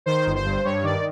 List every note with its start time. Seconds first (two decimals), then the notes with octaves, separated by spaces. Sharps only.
0.06 D#3 C5
0.26 G1
0.36 C5
0.45 G2
0.65 G2 C#5
0.83 D#3 D5